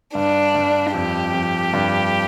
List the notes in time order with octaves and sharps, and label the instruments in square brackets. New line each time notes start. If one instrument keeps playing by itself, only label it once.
[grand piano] G2 [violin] D4
[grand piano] G2
[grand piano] F2 [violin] G4
[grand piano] F2
G2